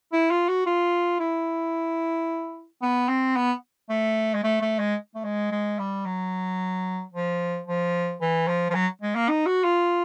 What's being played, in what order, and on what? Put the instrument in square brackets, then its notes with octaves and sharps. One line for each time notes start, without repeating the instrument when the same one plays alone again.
[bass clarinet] E4
F4
F#4
F4
E4
B3
C4
B3
A3
G#3
A3
A3
G#3
A3
G#3
G#3
G3
F#3
F3
F3
E3
F3
F3
F#3
G#3
A#3
D#4
F#4
F4